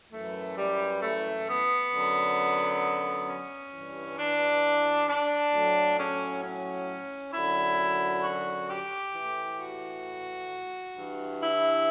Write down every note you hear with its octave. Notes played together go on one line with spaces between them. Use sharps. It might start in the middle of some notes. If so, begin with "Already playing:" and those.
F#2 E3 A3
G3
A3
B3
F#2 D3 F#3
C#4
G2 E3
D4
D4
A2 F#3
C#4
C#4
F#2 D3 F#3 E4
F#4
G4
A2 E3
F#4
G2 E3
E4